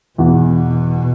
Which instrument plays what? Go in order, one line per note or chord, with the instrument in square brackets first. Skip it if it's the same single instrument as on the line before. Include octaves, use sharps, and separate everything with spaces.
[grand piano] E2 E3 B3 F#4 [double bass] B2